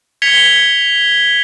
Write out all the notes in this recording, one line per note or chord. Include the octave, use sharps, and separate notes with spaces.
G#6 B6 C#7 F7 G7